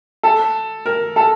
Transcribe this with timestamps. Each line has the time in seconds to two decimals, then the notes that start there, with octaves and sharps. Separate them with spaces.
0.23 A4
0.86 A#4
1.16 A4